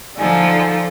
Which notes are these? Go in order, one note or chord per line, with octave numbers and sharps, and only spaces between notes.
D3 F3 D#4 A4 G#5